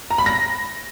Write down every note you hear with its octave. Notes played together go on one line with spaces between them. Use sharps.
A#5
B5
A#6